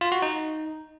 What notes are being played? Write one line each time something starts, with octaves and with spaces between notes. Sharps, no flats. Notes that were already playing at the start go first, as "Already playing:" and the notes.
F4
F#4
D#4